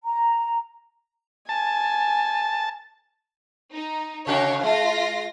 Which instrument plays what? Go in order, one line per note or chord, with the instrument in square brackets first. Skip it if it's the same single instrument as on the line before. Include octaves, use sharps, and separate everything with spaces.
[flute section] A#5
[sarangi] G#5 [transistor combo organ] A5
[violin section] D#4
[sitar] C3 F#4 [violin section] C#5 F5 G5
[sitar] G#3 [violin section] F4 A#6